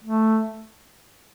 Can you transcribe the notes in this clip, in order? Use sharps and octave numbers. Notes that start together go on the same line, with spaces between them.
A3